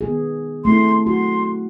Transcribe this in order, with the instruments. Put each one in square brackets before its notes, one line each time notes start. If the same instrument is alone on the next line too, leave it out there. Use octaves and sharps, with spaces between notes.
[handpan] D#3 B3 G#4
[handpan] A3 C4 E4 [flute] C6
[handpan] F#4 [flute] C6